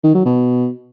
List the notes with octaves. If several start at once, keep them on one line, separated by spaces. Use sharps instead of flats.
D#3
F#3
B2